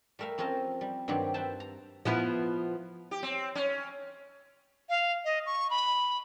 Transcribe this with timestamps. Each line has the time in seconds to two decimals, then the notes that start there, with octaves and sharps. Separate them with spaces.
0.19 G3 A3 A#4 E5 F5
0.38 F3 C4 C#4 A#4 D#5 A5
0.81 G3
1.08 G2 D#3 F#3 C4 G4 D5
1.34 B4 C5 E5 G5 A5
1.60 A#5
2.05 F3 B3 E4
3.11 G4
3.23 C4
3.55 C#4
4.89 F5
5.25 D#5
5.46 C#6
5.70 B5